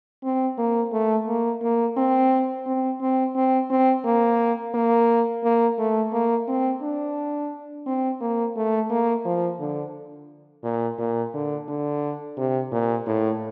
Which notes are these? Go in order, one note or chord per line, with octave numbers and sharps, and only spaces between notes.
C4
A#3
A3
A#3
A#3
C4
C4
C4
C4
C4
A#3
A#3
A#3
A3
A#3
C4
D4
C4
A#3
A3
A#3
F3
D3
A#2
A#2
D3
D3
C3
A#2
A2